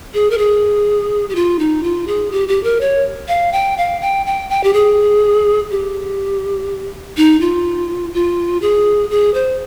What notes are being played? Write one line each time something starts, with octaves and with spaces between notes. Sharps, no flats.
G#4
A#4
G#4
G4
F4
D#4
F4
G#4
G4
G4
A#4
C#5
F5
G5
F5
G5
G5
G5
G4
G#4
G4
D#4
F4
F4
G#4
G#4
C5